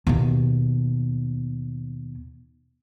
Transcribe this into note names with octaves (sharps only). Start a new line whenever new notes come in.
D#2 B2